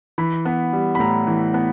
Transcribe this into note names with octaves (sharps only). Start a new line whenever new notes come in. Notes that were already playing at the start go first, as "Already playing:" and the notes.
E3 B5
B3
G3
B5
A2 A#5
E3
B3